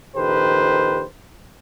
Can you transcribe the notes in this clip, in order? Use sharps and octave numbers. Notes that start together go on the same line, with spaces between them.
A#1 D#3 G4 A4 B4 C5